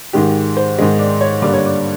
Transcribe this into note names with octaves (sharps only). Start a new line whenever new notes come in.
G#2 D#3 G#3 G4
C5
G#2 D#3 G#3
D5
C#5
G2 D3 G3 A#3 D5
C#5
D5